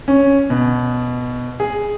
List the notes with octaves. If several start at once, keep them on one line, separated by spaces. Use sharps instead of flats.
C#4
B2
G#4